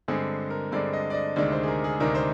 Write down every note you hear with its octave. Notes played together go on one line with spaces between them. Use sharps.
G2 D3 G#3 C4 G#4
A#4
G2 D3 G#3 C4 D5
D#5
D5
D#5
D2 C3 D#3 G#3 D4 D5
C5
G#4
A#4
G#4
D2 C3 D#3 G#3 D4 A#4
C5